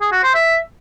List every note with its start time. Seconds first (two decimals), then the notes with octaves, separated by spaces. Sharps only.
0.01 G#4
0.12 F#4
0.23 C5
0.34 E5